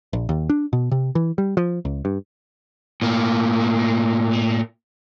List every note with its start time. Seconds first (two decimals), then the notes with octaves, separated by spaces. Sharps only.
0.13 A#1
0.29 D#2
0.49 D4
0.73 B2
0.91 C3
1.15 E3
1.38 G3
1.57 F3
1.85 C#2
2.05 G2
3.02 A2 A#3